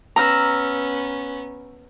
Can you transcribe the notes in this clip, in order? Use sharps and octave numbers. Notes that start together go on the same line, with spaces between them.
B3 C#4 A#5 E6 F6